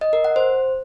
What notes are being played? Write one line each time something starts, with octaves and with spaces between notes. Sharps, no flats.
D#5
A#4
F#5
C5